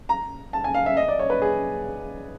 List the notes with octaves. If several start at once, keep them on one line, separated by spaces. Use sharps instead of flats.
A#5
A5
G#5
F5
E5
D#5
D5
C#5
B4
G#4